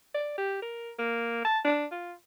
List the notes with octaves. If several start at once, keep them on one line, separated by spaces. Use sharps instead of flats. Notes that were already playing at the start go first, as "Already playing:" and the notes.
D5
G4
A#4
A#3
A5
D4
F4